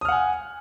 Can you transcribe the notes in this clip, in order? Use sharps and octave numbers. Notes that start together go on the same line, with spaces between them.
F#5 G#5 D#6 F6